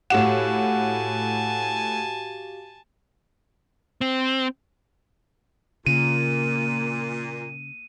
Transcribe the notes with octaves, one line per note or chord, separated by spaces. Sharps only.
A2 F#4 G4 F5 F#5 G#5 A5 E7
C4
A#2 C#3 A#3 D#7